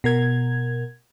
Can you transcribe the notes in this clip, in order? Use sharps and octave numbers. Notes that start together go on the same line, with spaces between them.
B2 A#4 G#6